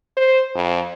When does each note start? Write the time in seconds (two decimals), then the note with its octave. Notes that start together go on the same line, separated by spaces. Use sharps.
0.17 C5
0.55 F2